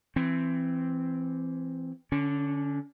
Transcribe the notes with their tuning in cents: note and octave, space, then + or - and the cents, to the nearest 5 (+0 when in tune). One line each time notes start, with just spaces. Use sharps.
E3 +20 C4 +0
D3 -5 C#4 +25